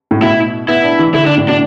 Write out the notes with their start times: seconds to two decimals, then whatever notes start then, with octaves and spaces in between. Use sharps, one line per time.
0.11 A2
0.22 B2 E4
0.68 B3 E4
0.83 D4
0.99 E3
1.14 D3 E4
1.26 D4
1.37 A2
1.48 B2 D4